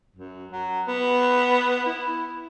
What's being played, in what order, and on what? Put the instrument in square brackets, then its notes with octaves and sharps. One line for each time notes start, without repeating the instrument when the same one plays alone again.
[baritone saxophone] F#2
F#3
B3
E4